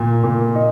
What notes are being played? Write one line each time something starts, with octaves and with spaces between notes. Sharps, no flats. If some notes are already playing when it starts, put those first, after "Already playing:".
Already playing: A#2
A#2
D#4